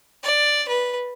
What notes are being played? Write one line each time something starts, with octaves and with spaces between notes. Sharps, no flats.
D5
B4